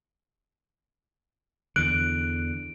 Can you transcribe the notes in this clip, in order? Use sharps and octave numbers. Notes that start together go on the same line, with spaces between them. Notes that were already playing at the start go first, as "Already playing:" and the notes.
E2 D3 F#6 D7